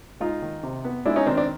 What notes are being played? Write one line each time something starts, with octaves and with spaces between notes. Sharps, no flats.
G#3 D#4 F4
D#3
C3
B3
G#3 D4 E4
C#4 D#4
D#3 C4 D4
C4 D4